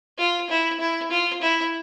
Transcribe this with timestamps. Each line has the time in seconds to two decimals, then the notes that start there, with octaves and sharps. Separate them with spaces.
0.18 F4
0.50 E4
0.80 E4
1.11 F4
1.41 E4